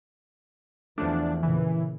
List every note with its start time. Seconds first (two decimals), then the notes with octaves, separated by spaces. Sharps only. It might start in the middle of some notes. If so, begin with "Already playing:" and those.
0.98 E2 E3 F3 A3 D4
1.43 A#2 C#3 E3